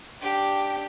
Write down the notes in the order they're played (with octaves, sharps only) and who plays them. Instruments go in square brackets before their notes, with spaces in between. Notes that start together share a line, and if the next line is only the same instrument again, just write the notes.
[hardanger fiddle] D4 G5 [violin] G4